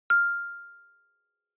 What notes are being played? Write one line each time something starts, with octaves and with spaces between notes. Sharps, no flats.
F6